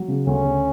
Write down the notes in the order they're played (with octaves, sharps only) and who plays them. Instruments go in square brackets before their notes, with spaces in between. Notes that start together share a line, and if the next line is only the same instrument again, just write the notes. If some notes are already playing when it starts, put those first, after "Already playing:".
Already playing: [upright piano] F#3
C#3
[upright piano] D2 [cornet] C#4
[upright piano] D2